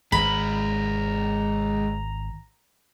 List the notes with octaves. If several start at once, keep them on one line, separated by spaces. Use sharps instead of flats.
G#1 G#3 B4 A#5 B5